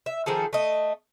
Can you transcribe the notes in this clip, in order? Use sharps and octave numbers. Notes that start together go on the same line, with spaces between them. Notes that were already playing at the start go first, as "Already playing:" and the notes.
E5
D#3 F3 G#4 A4
A3 D#5